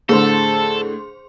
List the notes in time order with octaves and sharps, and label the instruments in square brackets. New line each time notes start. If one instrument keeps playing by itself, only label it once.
[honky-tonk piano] A2 D3 [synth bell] G#4 C5 C6 [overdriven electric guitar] A4